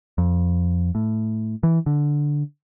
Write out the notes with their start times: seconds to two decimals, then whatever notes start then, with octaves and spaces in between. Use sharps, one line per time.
0.18 F2
0.95 A2
1.63 E3
1.86 D3